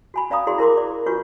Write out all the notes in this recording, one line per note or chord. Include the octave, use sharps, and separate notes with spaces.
F#4 G#5 B5
C#4 D5 F5 A#5 B5 D#6
E4 F#4 G#4 D5 C6
E4 A#4 C6 D6
D5
D4 F4 F#4 B4 C#6